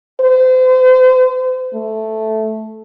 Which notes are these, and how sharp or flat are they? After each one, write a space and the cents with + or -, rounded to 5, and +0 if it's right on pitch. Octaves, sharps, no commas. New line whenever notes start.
C5 -35
A3 -5